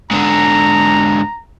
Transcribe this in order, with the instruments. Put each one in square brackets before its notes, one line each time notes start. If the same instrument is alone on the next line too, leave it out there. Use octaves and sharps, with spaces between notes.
[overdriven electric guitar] G#2 D3 [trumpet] A#5